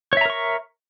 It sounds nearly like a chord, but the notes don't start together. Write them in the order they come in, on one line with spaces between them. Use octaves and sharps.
C#5 E5 A#5 A#4 C#6